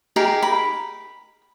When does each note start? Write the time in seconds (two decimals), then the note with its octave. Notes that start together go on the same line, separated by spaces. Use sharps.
0.16 D#4 G4 G#4 A#4
0.43 B5